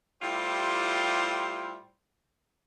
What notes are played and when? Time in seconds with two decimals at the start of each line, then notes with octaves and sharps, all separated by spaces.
0.22 A2 G3 E4 F4 G4 C5